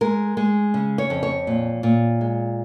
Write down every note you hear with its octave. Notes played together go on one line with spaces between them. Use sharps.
G#3 A#4
G#3
C#3
C#5
F2
C#5
A#2
A#2
G#3